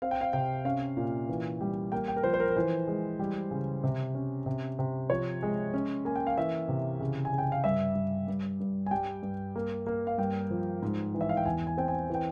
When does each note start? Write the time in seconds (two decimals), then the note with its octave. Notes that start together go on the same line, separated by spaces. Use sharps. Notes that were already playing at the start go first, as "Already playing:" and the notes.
0.02 C4 F5
0.11 G5
0.21 F5
0.33 C3 G5
0.65 C#4 F5
0.97 A#2
1.29 E3
1.61 G3
1.92 A#3 G5
2.08 G5
2.16 A#4
2.23 F3 C5
2.34 C5
2.40 A#4
2.50 A#4
2.56 E3 C5
2.88 G#3
3.19 G3
3.51 C#3
3.84 C3
4.15 C#4
4.46 C3
4.79 C3
5.10 F3 C#5
5.42 G#3
5.74 C#4
6.05 A#3 G#5
6.16 G5
6.27 F5
6.38 E3 E5
6.69 C3
7.00 C#3
7.25 G#5
7.33 C#3
7.38 G5
7.52 F5
7.64 G2 E5
7.96 G2
8.28 G2
8.60 G2
8.86 G#5
8.91 G3 G5
9.23 G2
9.56 A#3
9.87 A#3
10.07 F5
10.18 G2 G5
10.50 F3
10.82 G#2
11.14 E3
11.21 E5
11.29 F5
11.37 G5
11.45 E2 G#5
11.67 G#5
11.77 C4 G5
11.88 G#5
12.10 E3 G5